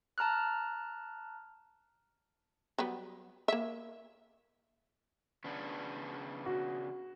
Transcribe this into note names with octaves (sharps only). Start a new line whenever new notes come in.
A5 A#5 F6 F#6
F#3 G3 B3
A#3 E5
C#3 B3 D4
F#4